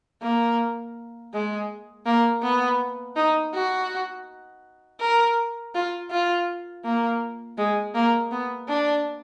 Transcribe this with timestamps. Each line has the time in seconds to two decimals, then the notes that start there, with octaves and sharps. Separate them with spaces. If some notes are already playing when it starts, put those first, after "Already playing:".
0.22 A#3
1.33 G#3
2.06 A#3
2.43 B3
3.16 D#4
3.54 F#4
5.00 A#4
5.75 F4
6.11 F4
6.84 A#3
7.58 G#3
7.95 A#3
8.31 B3
8.68 D4